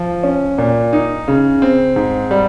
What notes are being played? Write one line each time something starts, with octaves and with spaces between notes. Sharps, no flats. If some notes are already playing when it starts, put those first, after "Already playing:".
Already playing: F3
C#4
A#2
D#4
C#3
C4
G#2
G3